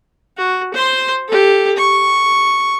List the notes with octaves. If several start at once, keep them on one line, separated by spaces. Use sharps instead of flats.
F#4
C5 C6
G4 A4
C#6